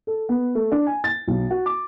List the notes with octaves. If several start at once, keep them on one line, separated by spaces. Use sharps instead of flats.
A4
B3
A3
D4
G#5
A6
B1
F#4
D6